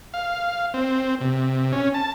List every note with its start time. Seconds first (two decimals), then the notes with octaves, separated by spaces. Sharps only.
0.14 F5
0.74 C4
1.21 C3
1.72 C#4
1.94 A5